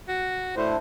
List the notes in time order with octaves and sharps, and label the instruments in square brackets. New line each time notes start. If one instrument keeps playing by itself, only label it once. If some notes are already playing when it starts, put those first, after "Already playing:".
[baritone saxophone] F#4
[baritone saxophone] A2 [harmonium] D4 E4 C5